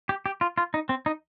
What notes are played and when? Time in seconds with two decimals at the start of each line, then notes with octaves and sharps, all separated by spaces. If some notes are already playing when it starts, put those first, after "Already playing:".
0.09 G4
0.26 G4
0.41 F4
0.58 F4
0.74 D#4
0.89 C4
1.06 D#4